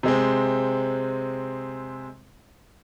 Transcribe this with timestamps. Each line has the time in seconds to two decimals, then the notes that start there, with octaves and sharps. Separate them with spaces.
0.03 C3 G#3 C4